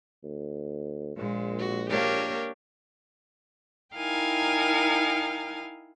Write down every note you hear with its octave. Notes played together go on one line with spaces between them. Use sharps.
D2
A#1 A#2 G#3
F#4
A#3 D4 G4 A#4 C#5
D#4 E4 A#4 F5 G5 G#5